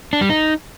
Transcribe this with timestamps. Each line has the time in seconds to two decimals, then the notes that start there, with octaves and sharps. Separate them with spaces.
0.13 D4
0.21 G3
0.30 D#4